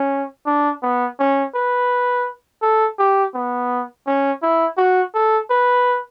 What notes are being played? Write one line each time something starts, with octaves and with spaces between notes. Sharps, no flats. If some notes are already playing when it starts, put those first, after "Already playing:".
Already playing: C#4
D4
B3
C#4
B4
A4
G4
B3
C#4
E4
F#4
A4
B4